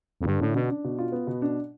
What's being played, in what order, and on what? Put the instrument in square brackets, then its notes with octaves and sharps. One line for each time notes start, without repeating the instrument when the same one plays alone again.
[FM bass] F2
[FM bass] G2 [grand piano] D3
[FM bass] A2 [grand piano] D4
[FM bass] B2 [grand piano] D4
[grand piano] D4
B2
F4
B3
B2
D4